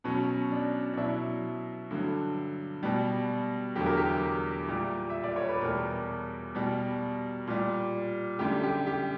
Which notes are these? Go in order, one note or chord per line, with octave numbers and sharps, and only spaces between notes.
B2 F#3 C#4
D4
D4
B2 F#3 E4
G2 D3 F#3
B2 G3
E2 D3 F#3 G4
A#4
G4
A#2 G3
E5
D5
C#5
B4
E2 B2 G3 A#4
B2 G3
A#2 G3
F#2 D3 G3 G4
G4
G4